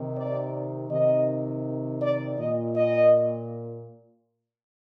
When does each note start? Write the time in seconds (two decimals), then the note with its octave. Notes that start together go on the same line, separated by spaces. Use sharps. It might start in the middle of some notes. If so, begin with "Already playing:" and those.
Already playing: C3 D#3
0.16 D5
0.90 C3 D#3 D#5
2.01 D5
2.38 A#2 D#5
2.75 D#5